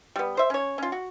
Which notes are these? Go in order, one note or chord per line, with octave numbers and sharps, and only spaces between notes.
G3 B3
C5 E5
C#4 C#5
C#4 F4
F#4